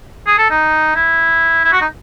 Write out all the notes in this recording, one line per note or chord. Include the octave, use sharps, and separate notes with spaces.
G#4
A4
D#4
E4
E4
F#4
D#4